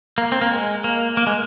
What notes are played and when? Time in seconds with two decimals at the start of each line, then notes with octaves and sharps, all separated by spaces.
0.18 A#3
0.32 C4
0.41 A#3
0.51 G#3
0.84 A#3
1.17 A#3
1.27 G#3